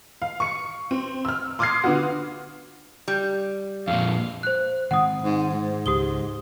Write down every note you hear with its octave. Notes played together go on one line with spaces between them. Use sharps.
F5
C#6 C#7
C4
E6 F6
C6 D6 D#6 F6 G#6 C7
D3 B3 F4 F#4
G3
F2 A#2 F5
C5 F#6
D#3 G#3 C4 F#5 D#6
G#2
G#2
C#2 G4 D#6 G7